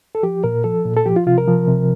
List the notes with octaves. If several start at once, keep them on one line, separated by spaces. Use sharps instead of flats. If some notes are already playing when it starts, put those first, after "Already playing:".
A4
F3 G4
A#2 A#4
F3 A4
A#2
A4
F3 G4
F4
C3 F4
A#4
F3
C3